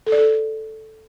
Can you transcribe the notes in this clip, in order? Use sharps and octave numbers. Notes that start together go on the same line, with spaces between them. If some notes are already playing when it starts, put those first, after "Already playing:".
A4
D5
A4